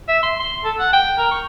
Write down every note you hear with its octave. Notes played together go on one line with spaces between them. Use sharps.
E5
C6
C6
A4
F#5
G5
A#4
C#6